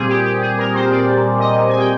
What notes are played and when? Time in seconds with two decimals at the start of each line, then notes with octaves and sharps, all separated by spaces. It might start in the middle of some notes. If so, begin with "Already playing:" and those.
Already playing: A#2 G3 C4 G#4
0.08 G4
0.25 G4
0.42 G#4
0.58 A#4
0.74 C5
0.91 D5
1.40 D#5
1.69 G#5
1.79 G5